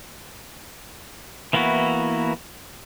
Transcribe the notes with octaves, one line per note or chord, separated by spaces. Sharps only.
E3 A#3 B3 E4 F#4